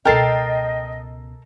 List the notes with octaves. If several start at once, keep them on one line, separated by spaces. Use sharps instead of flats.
C#2 B2 A4 A#4 D#5 G5 A6 C7